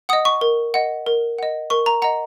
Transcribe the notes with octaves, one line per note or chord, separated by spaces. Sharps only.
D#5 F#5 D#6
C#6
A#4
D#5 F#5
A#4
D#5 F#5
A#4 C#6
A#5
D#5 F#5 A#5